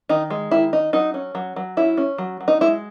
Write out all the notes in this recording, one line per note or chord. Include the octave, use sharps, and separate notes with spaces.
D#3 D#4
G#3
D#3 E4
D#4
F#3 D#4
C#4
F#3
F#3
C#4 E4
C#4
F#3
F#3
D#4
G#3 E4